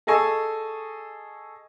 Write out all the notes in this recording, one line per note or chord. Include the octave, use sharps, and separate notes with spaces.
G#4 A4 D#5 G#5 C#6 E6